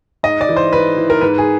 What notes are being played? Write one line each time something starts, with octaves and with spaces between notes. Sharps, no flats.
G#2 D#5
D5
E3
C5
G#2 B4
E3
A#4
G#2 B4
G#4